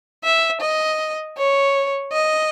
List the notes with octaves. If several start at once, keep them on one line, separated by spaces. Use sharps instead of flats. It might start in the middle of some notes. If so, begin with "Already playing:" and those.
E5
D#5
C#5
D#5